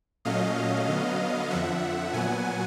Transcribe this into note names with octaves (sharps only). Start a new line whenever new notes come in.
A#2 F#3 A3 C#4 D#5 F5
D3 F#3 B3
F2 D3 F3 E5 F#5
A#2 F#3 B3 F#5 G#5